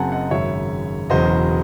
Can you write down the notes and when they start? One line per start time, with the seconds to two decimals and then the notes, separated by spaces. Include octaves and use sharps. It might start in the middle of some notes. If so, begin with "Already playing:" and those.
Already playing: F#1 F#2 C#3 F#3 C4 F#5 G#5 A5
0.12 D#5 F#5
0.31 G#1 F#2 C#3 G#3 C#5 E5
1.10 E1 E2 C#3 F#3 C5 D#5